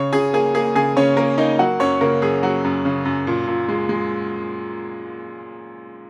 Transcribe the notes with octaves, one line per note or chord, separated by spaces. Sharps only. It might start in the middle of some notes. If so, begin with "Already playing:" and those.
Already playing: C#3 C#5 C#6
C#3 G#4 G#5
A#3 G#4 G#5
A#3 G#4 G#5
C#3 G#4 G#5
C#3 C#4 C#5
A#3 A#4
A#3 D#4 D#5
F#3 F#4 F#5
F#2 C#4 C#5
C#3 A#3 A#4
F#2 G#4
F#3 F#4
F#2
C#3
F#2
A#2
A#2
G#3
G#3